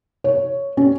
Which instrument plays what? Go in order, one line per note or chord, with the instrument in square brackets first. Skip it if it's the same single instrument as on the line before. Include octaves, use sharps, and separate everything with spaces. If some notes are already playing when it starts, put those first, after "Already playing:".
[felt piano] C#5
C#4